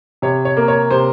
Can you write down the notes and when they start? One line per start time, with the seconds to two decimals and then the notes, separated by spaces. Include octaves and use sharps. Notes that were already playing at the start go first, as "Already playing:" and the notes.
0.22 C3 C#5
0.45 C#5
0.57 A#3
0.68 C#5
0.91 C3 C5